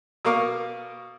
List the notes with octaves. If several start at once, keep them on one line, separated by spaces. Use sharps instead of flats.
B2 A#3 A#4 F5 C#6 D6